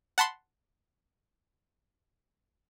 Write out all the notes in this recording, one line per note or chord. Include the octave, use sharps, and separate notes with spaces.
F#5 A5 B5 C6